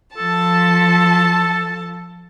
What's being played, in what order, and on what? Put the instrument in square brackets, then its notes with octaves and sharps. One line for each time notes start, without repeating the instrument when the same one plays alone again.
[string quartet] F3 A5 [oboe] A4